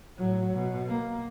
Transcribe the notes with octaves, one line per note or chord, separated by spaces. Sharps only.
A2 F#3
B2
A#3